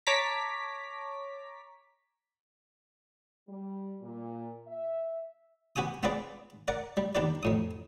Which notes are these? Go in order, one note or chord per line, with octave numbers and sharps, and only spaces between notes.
C#5 A5 A#5 D6 B6
G3
A#2
E5
B3 F#4 G4 G#5 D#6
B3 C4 F4 G#4 B4 D5
A#4 D5 F#5
G3
D#2 D4 G4 B4 D5
F2 A2 D#6